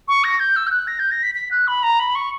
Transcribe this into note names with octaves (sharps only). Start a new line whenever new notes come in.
C#6
A#6
G6
E6
G6
F#6
A#6
G6
A#6
B6
B6
F#6
B5
A#5
B5
C#6